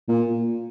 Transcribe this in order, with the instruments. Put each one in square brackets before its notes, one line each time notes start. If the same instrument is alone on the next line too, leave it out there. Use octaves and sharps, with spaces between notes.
[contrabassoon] A#2